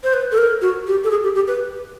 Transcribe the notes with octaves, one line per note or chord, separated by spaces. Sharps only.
C5
B4
A4
A#4
F#4
G4
A4
G#4
G4
G4
B4